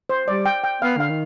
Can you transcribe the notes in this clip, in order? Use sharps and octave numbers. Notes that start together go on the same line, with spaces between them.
C5
G3 D5
G5
G5
B3 F5
D3 F5
D#3